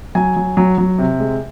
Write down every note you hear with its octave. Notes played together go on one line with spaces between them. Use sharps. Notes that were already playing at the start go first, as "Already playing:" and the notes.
F#3 G#5
F#3
F#3
F#3
C3
G#3